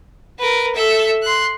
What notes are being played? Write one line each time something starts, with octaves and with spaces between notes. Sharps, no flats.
A#4 B4
A4 E5
C6 F#6